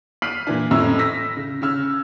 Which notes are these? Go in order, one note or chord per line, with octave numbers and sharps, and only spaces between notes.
F6 B6 C7 D7 D#7 F#7
A#2 E3 D4
F2 A2 A3 C#4 A#5 E6
E6 A#6 B6
C#3
C#3 C#4 E6 F6